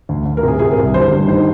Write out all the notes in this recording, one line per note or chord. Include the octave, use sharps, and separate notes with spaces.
D2
D2
A#4
C3 G#4
C3 G#4
A#4
C2
G1 C5
G2
D#3 C5